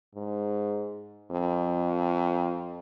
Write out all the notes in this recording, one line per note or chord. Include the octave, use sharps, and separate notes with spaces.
G#2
F2